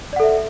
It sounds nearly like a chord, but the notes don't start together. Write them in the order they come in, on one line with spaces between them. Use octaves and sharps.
D5 F#5 A4 E5